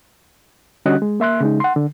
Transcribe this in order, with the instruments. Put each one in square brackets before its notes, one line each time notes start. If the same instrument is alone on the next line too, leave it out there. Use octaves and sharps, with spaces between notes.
[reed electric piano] D3 G3 C#4 F#4 D#5 F#6
G#3
A#3 E5 C6 F#6
C#3 G#3 D#4
F#5 C6
D3